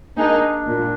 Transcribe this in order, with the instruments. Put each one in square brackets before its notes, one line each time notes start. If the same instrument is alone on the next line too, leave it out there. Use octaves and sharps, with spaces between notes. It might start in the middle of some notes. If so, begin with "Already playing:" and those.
[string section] A#3 D#4 G#4 [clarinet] D4
[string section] A#2